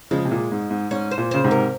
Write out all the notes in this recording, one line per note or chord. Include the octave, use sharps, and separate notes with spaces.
C#3 F3 G#3
C3
A#2
G#2
G#2
G#2 C#4
C5
A#2
C#3 C5
G#2 C3
A#4